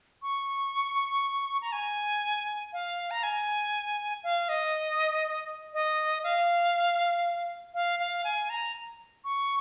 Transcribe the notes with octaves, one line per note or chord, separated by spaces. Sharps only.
C#6
A#5
G#5
F5
A#5
G#5
F5
D#5
D#5
F5
F5
F5
G#5
A#5
C#6